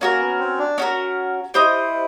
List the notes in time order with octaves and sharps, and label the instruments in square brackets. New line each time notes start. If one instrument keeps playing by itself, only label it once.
[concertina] A#3 [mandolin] C#4 F#4 A#4
[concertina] B3
C4
D4
[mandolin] C#4 F#4 A#4
[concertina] E4 [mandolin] G4 C5 D#5